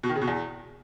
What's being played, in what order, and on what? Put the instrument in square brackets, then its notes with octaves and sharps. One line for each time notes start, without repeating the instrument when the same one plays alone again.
[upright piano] B2
D#3
C#3
B2
E2